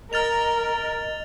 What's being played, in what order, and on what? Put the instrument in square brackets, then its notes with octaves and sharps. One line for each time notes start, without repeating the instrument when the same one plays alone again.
[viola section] A#4 [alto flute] D#5 [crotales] F6 A6 F7